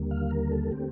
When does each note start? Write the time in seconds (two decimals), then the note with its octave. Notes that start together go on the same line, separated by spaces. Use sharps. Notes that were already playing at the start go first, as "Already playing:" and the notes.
Already playing: D#2 D3 G3 A#3
0.11 F5
0.31 A#4
0.51 A4
0.71 D3 A3 C4 G4